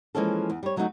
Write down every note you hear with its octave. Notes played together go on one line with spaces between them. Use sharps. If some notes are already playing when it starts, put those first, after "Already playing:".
E3 F3 G#3 A#3 C#4 A4
E2
G3 C#5
D2 F#3 A3 B3 D#4 F#4